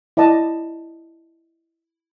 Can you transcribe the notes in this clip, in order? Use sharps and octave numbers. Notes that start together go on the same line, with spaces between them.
E4 D5 D#5 A5